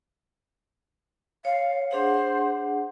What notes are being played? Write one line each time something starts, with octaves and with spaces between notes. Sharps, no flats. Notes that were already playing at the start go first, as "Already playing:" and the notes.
C#5 F5
D4 G#4 C5 F#5